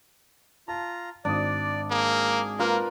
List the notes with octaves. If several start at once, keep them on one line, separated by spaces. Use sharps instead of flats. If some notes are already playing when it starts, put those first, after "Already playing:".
F4 A5 A#5
G#1 D4 D5 D#6
A#3 G#4
A#3 F4 A#4 B4